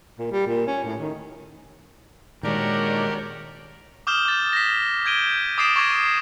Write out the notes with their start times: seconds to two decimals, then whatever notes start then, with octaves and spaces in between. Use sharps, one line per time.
0.19 A#2
0.31 G3
0.47 A#2
0.67 C#4
0.84 A2
1.00 D#3
2.43 A#2 D#3 G#3 D4 F#4 G4 A#4 C#5
4.07 D6 D#6 F6 G6 E7 G7
4.25 D6 A6
4.53 A#6 B6
5.05 G6 G#6 D7 D#7 G7
5.58 D6 D#6 A6 C7 D7 E7
5.76 C#6 D6 G#6 A#6 C7